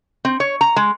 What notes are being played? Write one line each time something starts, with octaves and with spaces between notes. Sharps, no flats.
C4
C#5
A#5
G#3